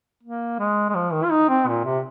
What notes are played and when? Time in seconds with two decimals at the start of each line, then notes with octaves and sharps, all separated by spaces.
0.23 A#3
0.59 G#3
0.89 G#3
0.95 F3
1.12 D#3
1.24 F4
1.31 D#4
1.49 C4
1.68 A#2
1.85 C3